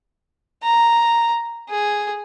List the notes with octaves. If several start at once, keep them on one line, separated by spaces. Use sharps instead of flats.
A#5
G#4